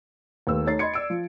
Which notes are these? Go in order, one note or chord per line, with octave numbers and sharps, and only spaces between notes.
D#2 A3 B4 E6
A3 D#4 C#5 A6 C7
D#5 B5 C6 G#6 C#7
D5 E6 D7
F3